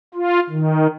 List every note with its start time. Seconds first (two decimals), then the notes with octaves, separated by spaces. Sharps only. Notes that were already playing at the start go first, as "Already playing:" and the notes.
0.14 F4
0.50 D#3